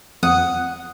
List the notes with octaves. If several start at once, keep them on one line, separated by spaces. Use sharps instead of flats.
F2 F#5 D#6